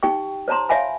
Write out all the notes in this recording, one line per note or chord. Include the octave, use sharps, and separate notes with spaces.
D#4 G4 G5 C#6
C5 C#5 A5 A#5 C6
C#5 E5 F5 G#5 B5